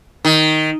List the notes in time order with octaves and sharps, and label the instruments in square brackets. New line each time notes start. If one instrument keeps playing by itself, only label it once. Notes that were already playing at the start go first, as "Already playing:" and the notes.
[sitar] D#3